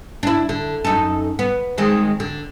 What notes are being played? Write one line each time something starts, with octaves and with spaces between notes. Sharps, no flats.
D4 E4
D3
F#2 D#4 A4
B3
D#3 G#3 C4
D3